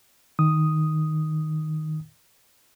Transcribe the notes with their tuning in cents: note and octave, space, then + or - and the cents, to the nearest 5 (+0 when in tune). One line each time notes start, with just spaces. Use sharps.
D#3 +0 D#6 +0